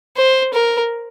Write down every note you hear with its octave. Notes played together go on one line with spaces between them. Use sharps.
C5
A#4